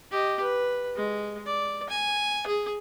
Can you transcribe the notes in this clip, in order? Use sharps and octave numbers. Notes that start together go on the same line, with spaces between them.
G4 D#5
B4
G#3
D5
G#5
G#4